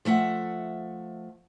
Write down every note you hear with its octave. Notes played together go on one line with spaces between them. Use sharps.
F3 A3 E5 F#5